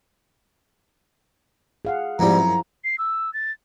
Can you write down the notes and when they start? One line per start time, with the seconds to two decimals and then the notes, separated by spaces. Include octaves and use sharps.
1.85 G#4 F5 F#5
2.19 F2 G#2 F3 G3 E4 A#5
2.38 F#2
2.84 C7
2.98 E6
3.34 A6